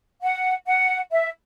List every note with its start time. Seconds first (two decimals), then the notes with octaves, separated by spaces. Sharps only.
0.22 F#5
0.66 F#5
1.11 E5